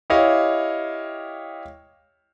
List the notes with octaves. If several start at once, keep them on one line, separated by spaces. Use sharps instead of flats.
E4 G4 C#5 D#5 F5